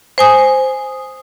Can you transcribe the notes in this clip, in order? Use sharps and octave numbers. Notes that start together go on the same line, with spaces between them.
C5 G#5 D#6